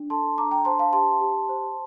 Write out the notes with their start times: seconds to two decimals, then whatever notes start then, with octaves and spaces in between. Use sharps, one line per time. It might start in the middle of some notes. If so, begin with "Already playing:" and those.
Already playing: D4
0.10 A4 A5 C6
0.38 D4 A#5 D6
0.51 G5 A#5
0.65 C5 A5 C6
0.79 F5 A5
0.93 G4 A5 C6
1.21 G4
1.49 C5